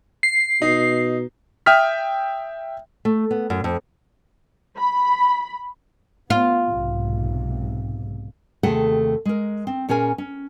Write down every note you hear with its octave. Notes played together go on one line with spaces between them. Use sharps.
C7
B2 D#4
E5 G5 D#6 F6 B6
A3
B3
F#2
F2
B5
B3 F4
B1 G#2 C3
D#2 C3 A3 G#4 A4 F#5
G#3 A#4
C4
A#2 C#4 G#4 A#4 G#5
C#4